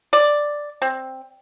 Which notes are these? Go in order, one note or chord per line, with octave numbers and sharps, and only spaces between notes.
D5
C4